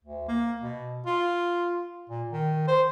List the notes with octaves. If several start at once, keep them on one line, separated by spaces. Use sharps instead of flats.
D2
A#3
B2
F4
A#2
D#3
C5